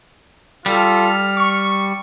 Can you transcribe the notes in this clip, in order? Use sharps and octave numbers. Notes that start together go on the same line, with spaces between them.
G3 F4 A4 F6
C#6